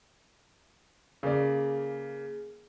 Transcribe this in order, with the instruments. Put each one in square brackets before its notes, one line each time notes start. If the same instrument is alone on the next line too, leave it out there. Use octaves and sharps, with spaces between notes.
[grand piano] C#3 A#3 D5 [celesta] G#4